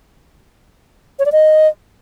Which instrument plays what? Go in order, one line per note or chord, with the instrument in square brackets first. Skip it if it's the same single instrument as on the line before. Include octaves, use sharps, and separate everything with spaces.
[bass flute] C#5
D5
D#5